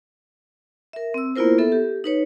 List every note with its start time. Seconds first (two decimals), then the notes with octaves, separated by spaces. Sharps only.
0.93 A#4 E5
1.14 C4 E6
1.36 A#3 B3 E4 F4 A#4 C5
1.58 B3 A4 E5
1.72 G4
2.04 D#4 B4 C#5